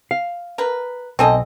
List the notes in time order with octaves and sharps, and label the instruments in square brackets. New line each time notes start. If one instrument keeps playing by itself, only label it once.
[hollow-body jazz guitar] F5
[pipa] A#4 B4
[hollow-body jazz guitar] B1 G#5 [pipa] C4 A4 D#5